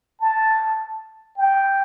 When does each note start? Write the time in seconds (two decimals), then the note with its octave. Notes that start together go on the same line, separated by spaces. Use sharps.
0.20 A5
1.38 G5